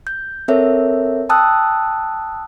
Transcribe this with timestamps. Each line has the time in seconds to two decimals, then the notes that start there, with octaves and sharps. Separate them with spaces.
0.07 G6
0.48 C4 A4 A#4 C#5 E5
1.29 G5 A5 D#6 E6 F#6